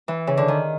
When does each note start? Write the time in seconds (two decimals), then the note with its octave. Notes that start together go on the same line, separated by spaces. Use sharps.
0.08 E3
0.27 C#3
0.37 D3
0.48 D#3